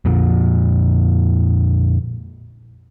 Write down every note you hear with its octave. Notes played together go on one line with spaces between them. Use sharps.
F2 A#2 F3